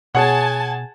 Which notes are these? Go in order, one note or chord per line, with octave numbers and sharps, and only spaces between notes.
B2 G#4 C#5 F#5 G#5 A5